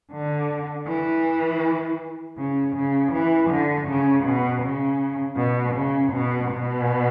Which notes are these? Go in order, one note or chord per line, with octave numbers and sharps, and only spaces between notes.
D3
E3
C#3
C#3
E3
D3
C#3
B2
C#3
B2
C#3
B2
B2